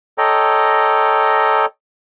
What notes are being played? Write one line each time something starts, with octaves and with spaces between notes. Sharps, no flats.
A4 C#5 D#5 G5 A#5